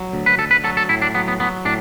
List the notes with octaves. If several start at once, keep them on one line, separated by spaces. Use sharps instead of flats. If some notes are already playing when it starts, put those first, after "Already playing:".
Already playing: F#3
D2
B4
D2 A4
B4
F#3 A4
A4
A2 E4
D4
F#3 B3
B3
F#3 B3
A2 D4